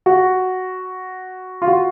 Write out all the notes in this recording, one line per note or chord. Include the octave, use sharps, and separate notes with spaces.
F#4
F4
F#4